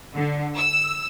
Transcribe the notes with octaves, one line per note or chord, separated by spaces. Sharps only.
D3
E6